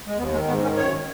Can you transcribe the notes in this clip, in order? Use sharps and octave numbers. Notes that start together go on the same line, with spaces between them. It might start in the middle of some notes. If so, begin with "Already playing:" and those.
G#3
D#2 B3
D#3 G#3
G#2 B3
D#3 C#4
F#2 C#5
D#3